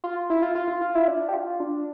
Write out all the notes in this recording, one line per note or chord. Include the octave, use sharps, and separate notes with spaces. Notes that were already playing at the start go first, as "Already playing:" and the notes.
F4
E4
F4
F4
F4
F4
E4
D4
G4
F4
D4